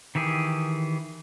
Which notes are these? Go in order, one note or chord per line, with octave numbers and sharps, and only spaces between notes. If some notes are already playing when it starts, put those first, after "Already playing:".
D#3 E3 G4 G#4